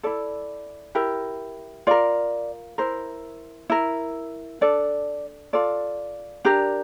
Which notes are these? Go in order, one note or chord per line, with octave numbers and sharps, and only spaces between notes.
E4 A4 D5
E4 G4 A#4
F4 A#4 D5
E4 A#4 C5
E4 A#4
D4 A4 D5
F4 A4 D5
D4 G4 A#4